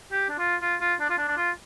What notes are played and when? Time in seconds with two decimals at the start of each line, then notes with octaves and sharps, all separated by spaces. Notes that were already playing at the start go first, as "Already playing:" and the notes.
0.12 G4
0.29 D4
0.38 F4
0.62 F4
0.81 F4
1.00 D4
1.10 F4
1.18 D4
1.28 D4
1.37 F4